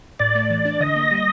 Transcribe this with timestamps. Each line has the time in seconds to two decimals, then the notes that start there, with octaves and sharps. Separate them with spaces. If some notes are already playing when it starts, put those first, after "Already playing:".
0.19 A2 D5
0.35 A3
0.50 E3
0.65 D4
0.80 D3 D#5
0.96 A#3
1.11 G3